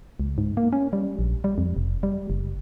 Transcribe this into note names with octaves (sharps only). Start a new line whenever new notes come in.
C#2
G#2
A#3
C#4
G3
A#1
G3
F2
F1
G3
F#1